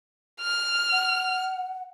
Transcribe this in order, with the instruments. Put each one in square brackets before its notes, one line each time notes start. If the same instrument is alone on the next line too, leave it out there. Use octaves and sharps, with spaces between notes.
[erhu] F6
[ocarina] F#5